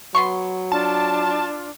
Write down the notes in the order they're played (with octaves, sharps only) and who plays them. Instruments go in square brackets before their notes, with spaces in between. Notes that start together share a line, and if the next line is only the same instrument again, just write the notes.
[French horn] F#3 [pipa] B3 C6 C#6
[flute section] D4 F4 [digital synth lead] A5